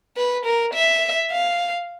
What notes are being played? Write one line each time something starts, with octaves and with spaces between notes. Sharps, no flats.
B4
A#4
E5
F5